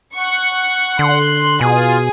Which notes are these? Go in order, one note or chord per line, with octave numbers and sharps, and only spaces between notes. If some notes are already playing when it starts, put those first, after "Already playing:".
F#5 C#6
D3 C6 F#6
B2 F4 G#4